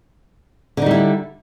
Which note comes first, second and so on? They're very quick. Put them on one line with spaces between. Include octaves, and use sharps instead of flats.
D3 D#4 G3 E4